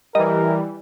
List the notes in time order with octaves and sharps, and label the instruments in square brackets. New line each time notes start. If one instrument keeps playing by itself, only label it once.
[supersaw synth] E3 G3 [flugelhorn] A#4 [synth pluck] D#5